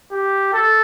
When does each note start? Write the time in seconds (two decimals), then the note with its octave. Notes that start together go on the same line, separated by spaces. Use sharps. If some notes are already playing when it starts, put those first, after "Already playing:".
0.12 G4
0.53 A4